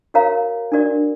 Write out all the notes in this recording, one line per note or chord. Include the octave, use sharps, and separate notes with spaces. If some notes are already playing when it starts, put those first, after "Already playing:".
F#4 A#4 C#5 F5 A#5
D4 F#4 A#4 D5